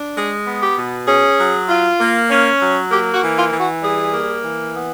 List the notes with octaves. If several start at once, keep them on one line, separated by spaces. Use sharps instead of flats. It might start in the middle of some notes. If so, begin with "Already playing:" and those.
Already playing: D4
G#3 G#4
B3
G4
B2
C#4 G#4
F#3
F4
A#3
C#4
F#3
A#3 G4
F#4
E3
F4
E3
F#4
G3 G#4
A#3
E3
B3